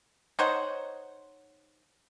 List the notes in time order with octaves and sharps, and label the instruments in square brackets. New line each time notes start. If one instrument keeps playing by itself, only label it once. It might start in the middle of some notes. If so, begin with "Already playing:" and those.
[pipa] D#4 C5 C#5 F#5